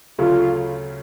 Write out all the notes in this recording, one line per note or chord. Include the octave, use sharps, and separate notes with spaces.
D2 C#3 F#3 A3 C#4 F4